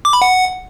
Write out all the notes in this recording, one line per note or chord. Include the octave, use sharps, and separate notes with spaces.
D6
B5
F#5